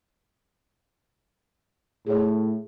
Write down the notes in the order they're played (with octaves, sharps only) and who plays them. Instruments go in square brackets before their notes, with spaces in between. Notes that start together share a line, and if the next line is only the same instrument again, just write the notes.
[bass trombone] A2 [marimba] G#4 C#5